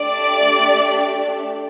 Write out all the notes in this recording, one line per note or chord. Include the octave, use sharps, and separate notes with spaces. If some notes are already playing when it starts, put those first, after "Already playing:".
Already playing: A3 D4 G4 D5 D6